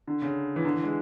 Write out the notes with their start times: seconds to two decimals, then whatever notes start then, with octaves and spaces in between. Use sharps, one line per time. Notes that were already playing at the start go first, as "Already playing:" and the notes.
0.07 D3
0.22 C#3
0.56 E3
0.65 D3
0.74 E3
0.83 G#3